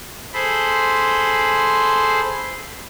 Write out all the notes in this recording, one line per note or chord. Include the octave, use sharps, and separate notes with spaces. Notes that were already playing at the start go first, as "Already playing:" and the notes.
G#4 A4 C5 B5 C6